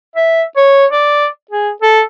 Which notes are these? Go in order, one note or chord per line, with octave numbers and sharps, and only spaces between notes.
E5
C#5
D5
G#4
A4